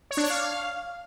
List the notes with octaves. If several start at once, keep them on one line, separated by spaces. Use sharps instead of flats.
C#5
D4
C#5
F5